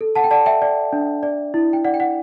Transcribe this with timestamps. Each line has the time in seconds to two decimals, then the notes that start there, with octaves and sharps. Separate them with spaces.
0.01 A4
0.16 F#5 A5
0.24 G5
0.31 D5 F#5 A5
0.46 E5 G5
0.62 D5
0.93 D4
1.23 D5
1.54 E4
1.73 G5
1.85 D5 F#5
1.94 G5
2.00 F#5